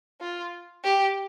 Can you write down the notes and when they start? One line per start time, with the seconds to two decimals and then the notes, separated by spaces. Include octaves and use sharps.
0.21 F4
0.84 G4